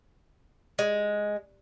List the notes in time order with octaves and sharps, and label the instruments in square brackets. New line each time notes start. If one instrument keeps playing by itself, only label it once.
[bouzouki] G#3